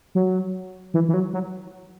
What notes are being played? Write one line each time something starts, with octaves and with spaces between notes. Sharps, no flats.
F#3
E3
E3
F#3
F#3